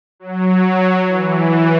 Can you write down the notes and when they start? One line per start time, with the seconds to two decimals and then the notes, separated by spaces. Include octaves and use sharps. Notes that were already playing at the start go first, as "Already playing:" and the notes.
0.20 F#3
1.07 E3